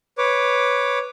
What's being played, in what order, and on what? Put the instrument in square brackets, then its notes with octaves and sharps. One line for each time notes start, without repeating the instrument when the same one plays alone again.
[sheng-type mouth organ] B4 C#5 D6